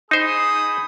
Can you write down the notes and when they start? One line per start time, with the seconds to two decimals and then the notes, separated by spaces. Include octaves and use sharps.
0.11 D#4 G#4 C5 B5 D#6